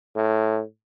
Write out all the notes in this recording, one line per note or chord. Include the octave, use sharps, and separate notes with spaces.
A2